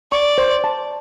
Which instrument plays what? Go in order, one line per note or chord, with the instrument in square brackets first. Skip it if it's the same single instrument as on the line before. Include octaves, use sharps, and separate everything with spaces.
[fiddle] D5 [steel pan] C#6
[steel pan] C5
A5